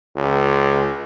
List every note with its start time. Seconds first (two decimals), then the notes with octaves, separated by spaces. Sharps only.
0.16 C#2